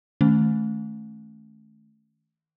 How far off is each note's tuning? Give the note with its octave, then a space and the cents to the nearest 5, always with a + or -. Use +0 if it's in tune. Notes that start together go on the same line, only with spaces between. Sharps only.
D#3 +10 A3 -20 C#4 +0